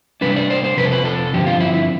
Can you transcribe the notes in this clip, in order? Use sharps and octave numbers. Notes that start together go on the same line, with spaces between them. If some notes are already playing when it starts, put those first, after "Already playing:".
C3 G3 D4 B4
D5
C5
C5
F2 C3 F3 B4
A4
B4
A4
G2 D3 F3 C4 G4
F4
E4
E4